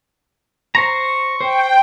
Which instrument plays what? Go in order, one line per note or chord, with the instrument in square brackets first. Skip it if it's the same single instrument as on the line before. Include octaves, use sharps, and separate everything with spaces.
[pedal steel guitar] C5 A#5 [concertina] C#6
[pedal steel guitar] C5 [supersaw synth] G5